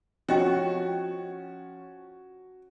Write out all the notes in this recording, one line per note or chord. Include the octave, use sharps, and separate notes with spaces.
F3 C#4 F#4 G4 D#5 G5